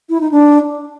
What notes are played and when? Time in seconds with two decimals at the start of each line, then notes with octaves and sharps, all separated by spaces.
0.10 E4
0.21 D#4
0.32 D4